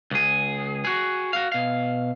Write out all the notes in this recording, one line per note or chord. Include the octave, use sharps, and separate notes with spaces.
C#2 G#4
F#4 G#4
F#4 F5
B2 F5